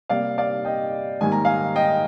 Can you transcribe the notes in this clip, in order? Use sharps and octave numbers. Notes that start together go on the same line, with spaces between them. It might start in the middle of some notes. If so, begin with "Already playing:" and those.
C3 G3 A#3 D5 F5
D5 F5
D#5 G5
G#2 D#3 G3 A#3 G#5
A#5
F5 G#5
D#5 G5